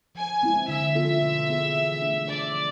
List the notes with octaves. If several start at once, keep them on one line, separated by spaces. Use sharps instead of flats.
F3 G#5
G#3 C4 E4
D3 E5
F3 B3 F4 A4
B2
B3 E4 G#4
E3
A3 D4
D3 D5
F3